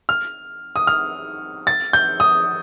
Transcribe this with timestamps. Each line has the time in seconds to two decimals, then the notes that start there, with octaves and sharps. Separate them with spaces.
0.09 F6
0.76 D#6
0.87 F6
1.67 A6
1.93 G6
2.20 D#6